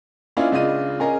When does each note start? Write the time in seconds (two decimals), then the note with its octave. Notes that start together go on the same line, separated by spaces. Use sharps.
0.37 A#3 C#4 D4 E4 F4 D#5
0.51 C#2 C#3 D4 F4 D#5 D#7
1.00 C#4 G#4 A#4 D#5 A#5